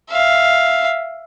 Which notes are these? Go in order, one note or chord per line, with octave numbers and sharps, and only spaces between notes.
E5 F5